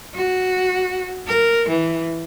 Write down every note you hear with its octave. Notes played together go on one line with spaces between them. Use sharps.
F#4
A#4
E3